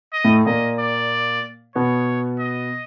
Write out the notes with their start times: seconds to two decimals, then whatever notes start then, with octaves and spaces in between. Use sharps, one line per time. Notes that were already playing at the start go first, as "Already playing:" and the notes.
0.13 D#5
0.24 A2 A3
0.46 A#2 A#3 D#5
0.79 D5
1.75 B2 B3 C#5
2.39 D#5